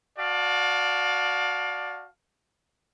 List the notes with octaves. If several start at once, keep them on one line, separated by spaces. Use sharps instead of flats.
F#4 D5 F5 A5